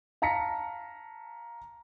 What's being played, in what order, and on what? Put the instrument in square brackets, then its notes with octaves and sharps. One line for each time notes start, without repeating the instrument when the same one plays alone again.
[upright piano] F5 A5 A#5 A#6 B6 C#7